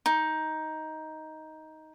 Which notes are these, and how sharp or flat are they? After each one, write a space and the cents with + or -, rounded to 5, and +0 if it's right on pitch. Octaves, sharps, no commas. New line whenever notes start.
D#4 +10